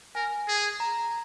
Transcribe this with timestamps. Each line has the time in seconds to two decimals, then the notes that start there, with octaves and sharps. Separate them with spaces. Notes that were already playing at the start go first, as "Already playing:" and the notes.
0.15 A#4 G#5
0.48 G#4
0.80 A#5